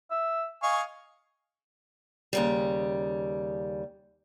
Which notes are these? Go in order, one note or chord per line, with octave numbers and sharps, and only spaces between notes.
E5
D#5 F5 G#5 C#6
D#2 C#3 G3